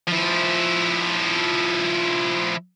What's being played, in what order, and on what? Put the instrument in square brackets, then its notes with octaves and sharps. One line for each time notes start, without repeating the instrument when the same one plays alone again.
[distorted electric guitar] F3 E4